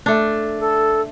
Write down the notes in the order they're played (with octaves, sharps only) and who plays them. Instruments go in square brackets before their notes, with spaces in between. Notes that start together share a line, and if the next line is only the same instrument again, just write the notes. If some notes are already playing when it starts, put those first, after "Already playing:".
[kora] A3 D4
[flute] A4